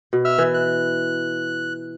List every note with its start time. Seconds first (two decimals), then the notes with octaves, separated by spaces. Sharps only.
0.13 B2
0.25 E5 E6 F6
0.38 E3
0.54 F#6